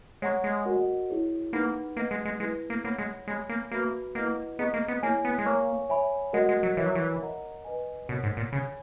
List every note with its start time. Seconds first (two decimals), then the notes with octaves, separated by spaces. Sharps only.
0.22 G#3 C#5 F#5 A#5 C#6
0.44 G#3
0.65 F#4 A#4 D#5 F#5
1.09 E4 G#4 C#5
1.53 A#3 D#4 G#4 B4 F#5 B5
1.97 A#3 B4 D#5 F#5
2.11 G#3
2.25 G#3
2.40 G#3 E4 G#4 B4
2.70 A#3
2.84 A#3 C#5 F#5 B5
2.98 G#3
3.27 G#3 C#5 G#5 B5
3.49 A#3
3.72 A#3 F#4 B4 E5 B5
4.15 A#3 E4 B4 D#5 F#5
4.59 B3 G#4 D#5 A#5 C#6
4.74 A#3
4.88 B3
5.03 A#3 E4 G#4 C#5 G#5
5.25 B3
5.39 G#3
5.46 A#3 C#5 G#5 C#6
5.89 C#5 E5 G#5 B5
6.33 G#3 F#4 A#4 D#5 F#5
6.49 G#3
6.63 F#3
6.77 E3 A#4 C#5 E5
6.86 F#3
6.95 E3
7.21 A#4 D#5 F#5 A#5
7.65 B4 D#5 G#5
8.09 B2 A#4 C#5 F#5
8.23 G#2
8.37 A#2
8.52 C#3 C#5 G#5 B5